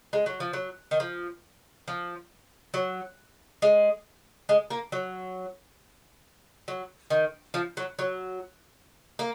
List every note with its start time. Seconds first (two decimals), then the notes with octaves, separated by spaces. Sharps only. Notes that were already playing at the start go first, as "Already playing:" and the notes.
0.13 G#3
0.26 F#3
0.40 F3
0.53 F#3
0.91 D#3
1.00 F3
1.88 F3
2.74 F#3
3.62 G#3
4.49 G#3
4.70 A#3
4.92 F#3
6.68 F#3
7.10 D#3
7.54 F3
7.77 F#3
7.99 F#3
9.19 A#3